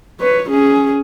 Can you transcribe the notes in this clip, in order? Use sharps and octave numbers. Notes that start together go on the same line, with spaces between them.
B4 C#5
C#4 G#4